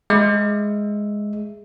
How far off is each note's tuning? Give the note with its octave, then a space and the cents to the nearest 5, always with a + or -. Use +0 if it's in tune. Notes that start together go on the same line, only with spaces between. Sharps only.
G#3 +0 E5 +0